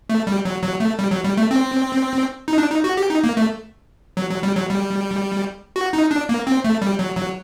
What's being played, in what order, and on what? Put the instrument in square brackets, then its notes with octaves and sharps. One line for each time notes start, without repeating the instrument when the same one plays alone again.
[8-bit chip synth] A3
G3
F#3
F#3
A3
G3
F#3
G3
A3
C4
D#4
D4
D#4
F#4
G4
D#4
A#3
A3
F#3
F#3
G3
F#3
G3
F#4
D#4
D4
A#3
C4
A3
G3
F#3
F#3